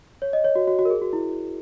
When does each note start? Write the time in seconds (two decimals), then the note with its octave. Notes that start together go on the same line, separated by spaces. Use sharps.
0.22 C#5
0.33 D#5
0.44 C#5
0.56 F#4
0.67 F#4
0.79 F#4
0.85 A#4
0.90 G#4
1.02 F#4
1.13 E4